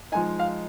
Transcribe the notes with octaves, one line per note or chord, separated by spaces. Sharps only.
F3 G#3 D#4 G#5
F5